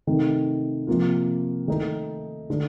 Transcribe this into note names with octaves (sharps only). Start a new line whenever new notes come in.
C3 D#3 A3
C3 F3 A#3 F4
D#3 A3 D#4 A#4
D3 A3